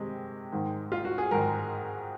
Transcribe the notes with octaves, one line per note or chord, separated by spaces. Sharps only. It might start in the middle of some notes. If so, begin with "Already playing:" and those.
Already playing: C3 D#3 G#3
G#2 D#3 G#3
F4
F#4
G#4
G#2 D#3 G#3 A#4